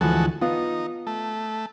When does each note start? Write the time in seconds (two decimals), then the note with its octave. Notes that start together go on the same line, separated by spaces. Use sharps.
0.01 D2 E3 F3 G#3 F#4 A4
0.42 B3 D#4 F4
1.07 A3